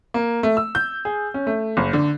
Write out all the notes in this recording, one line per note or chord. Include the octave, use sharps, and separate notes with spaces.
A#3
A3
E6
G6
G#4
C#4
A3
F#1
D3